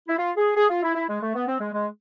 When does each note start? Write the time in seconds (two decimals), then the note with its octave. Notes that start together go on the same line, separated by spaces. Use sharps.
0.08 E4
0.17 F4
0.37 G#4
0.56 G#4
0.69 F4
0.83 E4
0.95 E4
1.08 G#3
1.22 A3
1.35 B3
1.47 C4
1.60 G#3
1.73 G#3